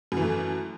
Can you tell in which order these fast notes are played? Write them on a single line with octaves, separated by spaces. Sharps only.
F#2 E3 A3